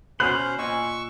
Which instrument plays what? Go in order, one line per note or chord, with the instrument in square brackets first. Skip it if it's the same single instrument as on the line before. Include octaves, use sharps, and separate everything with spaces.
[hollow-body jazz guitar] B2 [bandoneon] C#4 C5 [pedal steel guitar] B5 C6 F6 [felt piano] F#6
[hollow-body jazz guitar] A#2 D#5 G#5 [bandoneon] C#6 E6